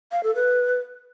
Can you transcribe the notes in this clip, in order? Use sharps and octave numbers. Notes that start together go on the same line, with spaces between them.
F5
A4
B4